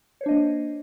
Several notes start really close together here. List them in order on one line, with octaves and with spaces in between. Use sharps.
C#5 C5 D4 D#5 A#3